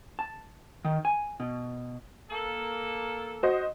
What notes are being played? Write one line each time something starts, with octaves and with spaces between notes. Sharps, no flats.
A5
D#3
G#5
B2
A#3 A4
F#4 C5 D#5